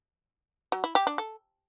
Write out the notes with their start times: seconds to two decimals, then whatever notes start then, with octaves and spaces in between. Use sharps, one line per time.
0.72 F#3
0.84 E4
0.95 G4
1.07 D4
1.18 A4